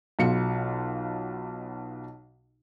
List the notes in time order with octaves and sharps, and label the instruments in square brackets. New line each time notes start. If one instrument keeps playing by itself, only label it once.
[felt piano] B1 B2 F4 C#7